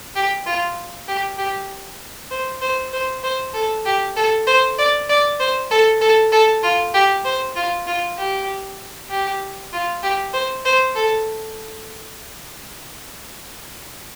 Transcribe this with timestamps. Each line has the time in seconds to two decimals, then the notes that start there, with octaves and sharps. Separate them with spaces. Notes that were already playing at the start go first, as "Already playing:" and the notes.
0.15 G4
0.46 F4
1.08 G4
1.38 G4
2.31 C5
2.61 C5
2.93 C5
3.24 C5
3.54 A4
3.85 G4
4.16 A4
4.47 C5
4.78 D5
5.09 D5
5.40 C5
5.71 A4
6.01 A4
6.32 A4
6.63 F4
6.94 G4
7.25 C5
7.56 F4
7.87 F4
8.17 G4
9.10 G4
9.73 F4
10.03 G4
10.33 C5
10.65 C5
10.95 A4